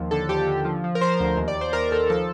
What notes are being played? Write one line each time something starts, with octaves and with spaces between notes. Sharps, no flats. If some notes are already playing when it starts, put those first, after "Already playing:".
Already playing: D#2 F3
D3 A4
D#2 G4
D3
F3
F3
A#4
F3 C5
D2
D#2
D5
D#2
C5
D#2 A#4
D#2 A4
F3 A4